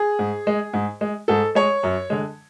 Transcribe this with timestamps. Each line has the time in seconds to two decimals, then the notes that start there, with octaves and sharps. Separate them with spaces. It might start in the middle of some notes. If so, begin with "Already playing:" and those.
Already playing: G#4
0.19 G#2
0.47 G#3
0.73 G#2
1.01 G#3
1.28 G#2 A4
1.55 G#3 C#5
1.83 F#2
2.10 D3 G#3